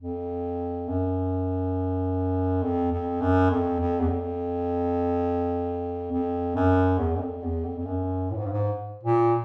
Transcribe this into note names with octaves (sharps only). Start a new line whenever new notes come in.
F2
F#2
F2
F2
F#2
F2
F2
E2
F2
F2
F#2
E2
F#2
F2
E2
F2
F2
F#2
A2
G#2
G2
G#2
A#2